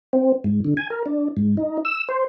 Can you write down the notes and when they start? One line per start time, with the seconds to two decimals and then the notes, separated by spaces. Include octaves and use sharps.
0.13 C4
0.44 G#2
0.65 D3
0.77 G#5
0.90 A#4
1.06 D4
1.37 G#2
1.57 D#4
1.85 E6
2.09 C5